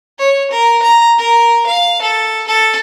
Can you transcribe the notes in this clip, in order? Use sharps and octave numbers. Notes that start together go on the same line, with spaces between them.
C#5
A#4
A#5
A#4
F5
A4
A4